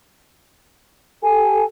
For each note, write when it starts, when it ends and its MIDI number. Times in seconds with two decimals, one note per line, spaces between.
1.24 1.62 67
1.24 1.62 69
1.24 1.65 80